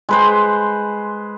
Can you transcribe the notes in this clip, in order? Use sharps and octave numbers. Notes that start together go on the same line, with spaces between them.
G#3 B4 C5